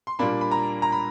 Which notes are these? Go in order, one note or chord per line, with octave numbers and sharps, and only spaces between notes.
C6
A#2 G3 A#3 D4 B5
B5
A#5
A#5
B5